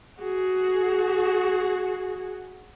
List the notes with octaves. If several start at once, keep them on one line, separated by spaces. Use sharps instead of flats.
F#4 G#4